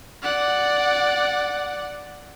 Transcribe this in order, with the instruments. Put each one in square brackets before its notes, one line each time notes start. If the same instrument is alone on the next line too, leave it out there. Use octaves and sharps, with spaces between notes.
[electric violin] D5 F#5